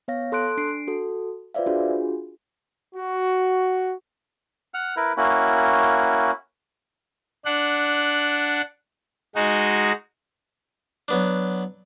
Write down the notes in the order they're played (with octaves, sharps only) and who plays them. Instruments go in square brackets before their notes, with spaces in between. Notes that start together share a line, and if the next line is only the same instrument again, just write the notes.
[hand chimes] B3 C#5 F5 A#6
A4 C6 F#6 D7
D4 C7 D7
F#4 A4
F4 B4 C5 D5 E5 F5
D4 F4 F#4 G#4
[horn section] F#4
[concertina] F#5 F6
E4 A#4 B4
A#3 C#4 E4 F#4
[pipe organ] D4 F#5
G#3 D#4 F#4
[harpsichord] F#3 B3 D4